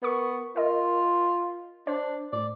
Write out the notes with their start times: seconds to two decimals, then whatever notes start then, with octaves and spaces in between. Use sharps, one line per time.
0.03 B3 A#4 C#6
0.56 F4 A#4 D#5
1.87 D4 C5
2.33 A2 D5